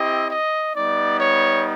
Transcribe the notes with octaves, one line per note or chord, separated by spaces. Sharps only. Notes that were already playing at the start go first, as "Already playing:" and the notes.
Already playing: C4 E4 G4 D#5
D#5
G3 B3 D#4 D5
C#5